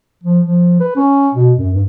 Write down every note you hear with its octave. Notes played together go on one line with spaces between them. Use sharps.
F3
F3
B4
C#4
B2
F#2
G2